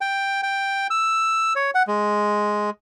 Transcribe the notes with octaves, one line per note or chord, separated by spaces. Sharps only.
G5
G5
E6
C#5
F#5
G#3